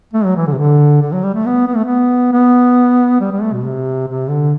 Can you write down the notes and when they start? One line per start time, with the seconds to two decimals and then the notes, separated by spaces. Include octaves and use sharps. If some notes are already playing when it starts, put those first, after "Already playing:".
0.13 A3
0.24 F#3
0.36 E3
0.47 D3
0.52 C3
0.57 D3
1.01 D3
1.12 F#3
1.23 G3
1.34 A3
1.46 B3
1.67 B3
1.76 A3
1.85 B3
2.33 B3
3.20 G3
3.31 G3
3.42 A3
3.53 B2
3.64 C3
4.08 C3
4.29 D3